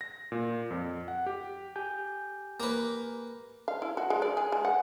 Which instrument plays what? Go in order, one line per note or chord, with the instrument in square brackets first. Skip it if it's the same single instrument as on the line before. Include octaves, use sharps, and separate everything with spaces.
[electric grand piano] A#6
A#2
F2
F#5
G4
[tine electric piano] G4 G#5 G6
[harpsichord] A#3 B4
[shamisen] F5
E4
F#4
G#3
D5
G#4
G#3
F#5